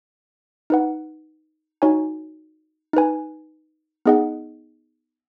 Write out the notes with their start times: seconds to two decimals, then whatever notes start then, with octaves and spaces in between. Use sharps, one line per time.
0.70 D#4 B4 F#5
1.82 D#4 F#4 C#5 G#5
2.93 D#4 B4 G#5
4.06 B3 D#4 G#4 D#5 F#5